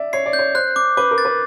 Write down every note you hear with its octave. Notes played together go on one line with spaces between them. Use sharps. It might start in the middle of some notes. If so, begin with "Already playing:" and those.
Already playing: D5 E5
C#5 C7
D5
G6
C#5
C5 F#6
D6
B4 D6
A#4
A6
B4